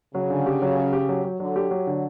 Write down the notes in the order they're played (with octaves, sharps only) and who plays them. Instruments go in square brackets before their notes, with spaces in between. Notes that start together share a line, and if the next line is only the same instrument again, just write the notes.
[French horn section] C#3 [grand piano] F#3
[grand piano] D3
G4
F#3
C#4
G4
F#3
F#3
[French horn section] D3 [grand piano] F#3
[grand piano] G4
F#3
D3